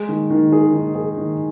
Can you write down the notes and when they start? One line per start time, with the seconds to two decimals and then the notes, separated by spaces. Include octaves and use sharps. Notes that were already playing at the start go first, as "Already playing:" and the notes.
Already playing: G#3
0.09 D#3
0.31 D#3
0.52 G#4
0.74 D#3
0.95 G#4
1.18 D#3